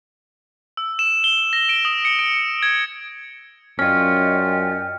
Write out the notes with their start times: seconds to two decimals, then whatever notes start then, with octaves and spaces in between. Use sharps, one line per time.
0.77 E6
0.99 E7
1.24 G7
1.53 A#6
1.69 D7
1.85 D#6
2.05 C#7
2.19 D7
2.63 G#6
3.79 F#2 C#4 F4 D5 D#5 G5 F6